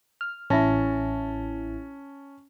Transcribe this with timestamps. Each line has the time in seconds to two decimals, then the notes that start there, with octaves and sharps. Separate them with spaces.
0.21 F6
0.50 A1 C#4 E4 A5 A#6